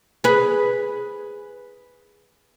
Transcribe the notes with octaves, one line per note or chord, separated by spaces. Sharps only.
G#4 B4